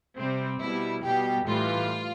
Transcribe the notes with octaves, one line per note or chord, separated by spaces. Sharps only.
C3 G3 C4
B2 G3 E4
B2 G3 G4
A2 E3 G3 F4